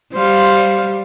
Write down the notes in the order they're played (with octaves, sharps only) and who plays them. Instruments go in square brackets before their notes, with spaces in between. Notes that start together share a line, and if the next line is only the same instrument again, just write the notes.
[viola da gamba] G3 [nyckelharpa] C5 F5